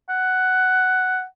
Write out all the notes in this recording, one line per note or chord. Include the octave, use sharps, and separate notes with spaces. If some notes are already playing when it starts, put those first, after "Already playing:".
F#5